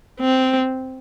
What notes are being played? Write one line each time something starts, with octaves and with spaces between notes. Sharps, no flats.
C4